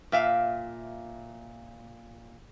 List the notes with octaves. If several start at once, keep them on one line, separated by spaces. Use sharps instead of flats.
A#2 E5 F5